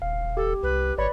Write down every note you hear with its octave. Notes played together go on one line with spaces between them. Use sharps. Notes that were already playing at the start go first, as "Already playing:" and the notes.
D#1 F5
G4 A4
C2 B4
G#1 B4 C#5 D5 B5